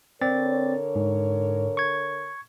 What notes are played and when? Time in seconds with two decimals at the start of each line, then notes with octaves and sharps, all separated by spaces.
0.22 D3 C4 A#4 C#5 D5 A6
0.95 G#2
1.77 C#6 G#6